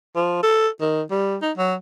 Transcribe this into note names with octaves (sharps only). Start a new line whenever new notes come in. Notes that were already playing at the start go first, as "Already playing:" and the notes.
F3
A4
D#3
G3
D#4
F#3